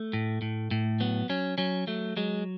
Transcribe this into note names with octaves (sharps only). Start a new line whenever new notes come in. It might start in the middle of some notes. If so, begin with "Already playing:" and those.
Already playing: A3
A2
A2
A2
F#3 B3
F#3 C#4
F#3 C#4
F#3 A3
F#3 G#3